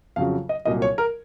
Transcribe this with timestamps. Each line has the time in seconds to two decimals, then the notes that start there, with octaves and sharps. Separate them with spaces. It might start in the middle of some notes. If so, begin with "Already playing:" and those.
0.16 F2 C#3 F#3 F5
0.49 D#5
0.65 C2 A#2 F#3 D#5
0.82 C#5
0.98 A#4